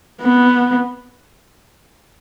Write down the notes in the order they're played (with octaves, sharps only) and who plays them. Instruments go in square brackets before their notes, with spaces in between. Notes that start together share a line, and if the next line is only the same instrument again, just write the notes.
[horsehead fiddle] B3